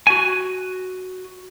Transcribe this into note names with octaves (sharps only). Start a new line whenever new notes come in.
F#4 G#5